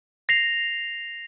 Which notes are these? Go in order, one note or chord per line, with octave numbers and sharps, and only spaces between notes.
A#6 C7 F7